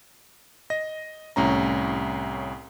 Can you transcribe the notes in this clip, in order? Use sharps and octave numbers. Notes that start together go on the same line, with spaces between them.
D#5 A#6
C2 A2 C#4 A#5